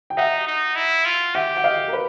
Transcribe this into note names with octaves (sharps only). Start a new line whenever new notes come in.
G5
D#4 E5 F#5
D#4
E4
F4
G4 E5 F#5
F#5
D#5 F5
A#4
B4